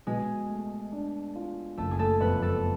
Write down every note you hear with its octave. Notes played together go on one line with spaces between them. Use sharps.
B2 G#3 G#4
A3
D4
F4
F#1 A3 A4
G#4
A3 A4
F2 B3 B4
A3 A4